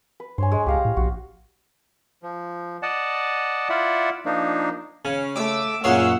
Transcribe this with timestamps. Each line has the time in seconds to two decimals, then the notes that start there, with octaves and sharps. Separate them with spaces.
0.20 B4
0.38 G2 C5 C#5 G#5
0.52 G#3
0.66 C#2 G4 F5 A#5
0.85 A2
0.97 A#1 F#4
2.23 F3
2.83 D5 D#5 F#5 A5
3.70 E4 F4 D5 E5 F#5
4.25 F3 A#3 D4 D#4
5.05 C#3 C#4
5.36 A3 D6 E6
5.84 F#2 A#2 G#4 C#5 F5 F#5 E6